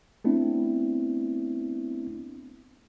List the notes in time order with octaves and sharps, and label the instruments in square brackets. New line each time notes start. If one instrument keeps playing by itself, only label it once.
[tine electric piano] A3 B3 C4 D4 E4